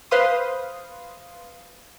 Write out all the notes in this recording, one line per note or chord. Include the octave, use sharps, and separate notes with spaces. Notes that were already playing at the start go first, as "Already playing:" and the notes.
B4 C5 F5 C6 D#6